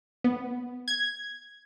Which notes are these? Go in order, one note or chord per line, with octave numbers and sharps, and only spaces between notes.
B3
G#6